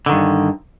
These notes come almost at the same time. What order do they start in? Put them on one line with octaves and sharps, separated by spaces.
D3 D#3 G2